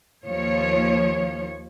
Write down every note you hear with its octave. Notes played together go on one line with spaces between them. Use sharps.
D#2 F3 C#5